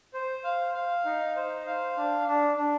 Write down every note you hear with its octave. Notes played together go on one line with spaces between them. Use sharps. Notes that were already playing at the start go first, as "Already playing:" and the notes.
C5
F5
F5
D#4
C5
F5
D4
D4
D4